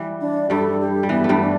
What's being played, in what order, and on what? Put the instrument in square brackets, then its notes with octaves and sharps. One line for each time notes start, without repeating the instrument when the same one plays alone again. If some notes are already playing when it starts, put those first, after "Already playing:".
Already playing: [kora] E3 G3
[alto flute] D4
[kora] G2 G3 [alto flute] A4
[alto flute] G4
[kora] G3
[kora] E3 [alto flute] B3
[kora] A3
G2 G3
[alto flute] D4